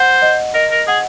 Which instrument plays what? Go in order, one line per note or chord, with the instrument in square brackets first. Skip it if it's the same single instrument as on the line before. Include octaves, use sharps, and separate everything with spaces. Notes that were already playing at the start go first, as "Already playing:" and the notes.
Already playing: [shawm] C5 [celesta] F#5
[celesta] D#5
[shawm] A#4 [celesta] D#5
[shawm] A#4
[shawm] G#4 [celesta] F#5